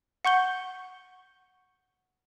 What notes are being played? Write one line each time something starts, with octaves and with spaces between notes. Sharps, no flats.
F#5 C#6 G6 G7